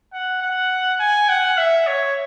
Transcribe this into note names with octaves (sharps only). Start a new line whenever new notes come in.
F#5
F#5
G#5
F#5
E5
C#5